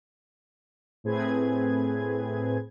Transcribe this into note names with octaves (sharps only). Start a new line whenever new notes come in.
A2 C4 G#4 B4 G#6